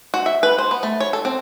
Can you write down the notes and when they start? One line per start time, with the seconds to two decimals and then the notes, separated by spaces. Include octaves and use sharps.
0.14 F#4
0.26 E5
0.43 B4
0.58 C5
0.71 B3
0.83 A3
1.00 C#5
1.13 A4
1.25 C4